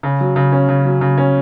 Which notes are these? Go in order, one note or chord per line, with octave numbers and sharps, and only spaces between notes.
C#3
F#3
C#3
C#4
C#3
F#3
C#3
C#4